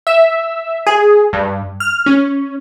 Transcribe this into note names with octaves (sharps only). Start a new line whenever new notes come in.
E5
G#4
G2
F6
C#4